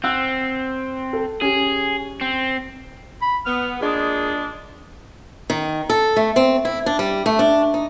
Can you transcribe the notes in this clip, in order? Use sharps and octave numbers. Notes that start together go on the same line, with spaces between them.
C4 F#5 E6 F#6
A4
C#4 G4 G#4
C4
B5
B3 F6
A#2 G#3 D4 G#4
D#3
A4
A3
C4
E4
D4
G3
A3
D4
D#4